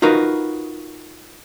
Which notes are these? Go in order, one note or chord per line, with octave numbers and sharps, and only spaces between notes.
D#4 F4 F#4 A#4 B4